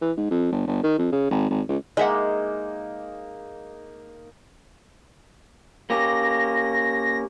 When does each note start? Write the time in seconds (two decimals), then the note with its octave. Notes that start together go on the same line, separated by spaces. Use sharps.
0.02 E3
0.17 G#2
0.30 F2
0.52 G1
0.67 G1
0.83 D#3
0.99 F2
1.12 C#3
1.30 G#1
1.50 G#1
1.69 C#2
1.97 G#3 A#3 D#4 D#5 E5 F#5
5.90 A#3 C#4 G4 A#6